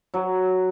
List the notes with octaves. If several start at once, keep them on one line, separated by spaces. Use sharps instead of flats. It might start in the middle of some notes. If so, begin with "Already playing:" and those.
F#3